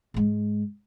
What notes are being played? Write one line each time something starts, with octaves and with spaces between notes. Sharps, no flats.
G#2 G#3